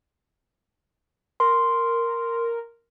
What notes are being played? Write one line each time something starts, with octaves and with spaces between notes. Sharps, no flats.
A#4 C6